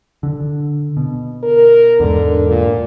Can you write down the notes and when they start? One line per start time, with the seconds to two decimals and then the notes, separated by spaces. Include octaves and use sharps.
0.23 D3
0.97 B2
1.43 A#4
2.00 E2 G#2 D3
2.49 A#2